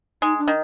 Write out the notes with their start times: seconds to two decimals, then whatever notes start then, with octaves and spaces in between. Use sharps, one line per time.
0.22 G#3 D#4
0.39 D4
0.48 D#3